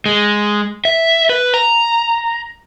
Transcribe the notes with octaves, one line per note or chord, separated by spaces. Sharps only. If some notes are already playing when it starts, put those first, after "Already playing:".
G#3
E5
B4
A#5